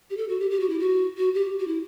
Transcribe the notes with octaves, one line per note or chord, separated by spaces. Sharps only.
G4
A4
F#4
G4
G4
F#4
E4
F#4
F#4
G4
F#4
E4